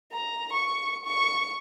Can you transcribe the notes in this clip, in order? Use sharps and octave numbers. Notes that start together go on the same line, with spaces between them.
A#5
C#6
C#6